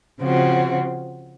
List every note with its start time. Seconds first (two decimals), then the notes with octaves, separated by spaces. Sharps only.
0.21 C#3 F3 C4 F#4